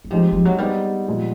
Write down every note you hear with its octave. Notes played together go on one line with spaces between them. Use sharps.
F#3
F3 G#3 C4 D#4 G4
F3
F#3
G3 B3 D#4 G#4 C5
A#2 F3 G#3 B3